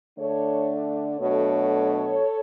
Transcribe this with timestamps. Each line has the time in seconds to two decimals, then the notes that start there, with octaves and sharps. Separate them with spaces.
0.18 D3 A3 D4 A4 C#5
1.18 B2 F#3 A3 D4 A4 C#5